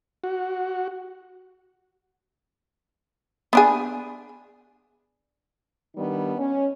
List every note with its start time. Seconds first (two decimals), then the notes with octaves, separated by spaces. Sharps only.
0.24 F#4
3.53 B3 D4 G#4
5.96 D#3 G3 B3 D4 D#4
6.38 C#4